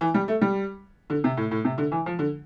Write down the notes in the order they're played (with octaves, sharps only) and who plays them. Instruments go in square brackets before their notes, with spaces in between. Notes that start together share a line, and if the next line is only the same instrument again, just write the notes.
[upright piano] E3
G3
A3
G3
D3
C3
A2
A2
C3
D3
E3
F3
D3